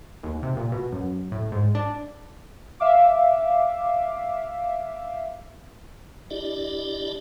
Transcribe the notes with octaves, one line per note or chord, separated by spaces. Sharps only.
D#2
C3
A#2
B2
F#2
A2
G#2
D4
E5 F5 D6
D4 E4 G4 D5 D#5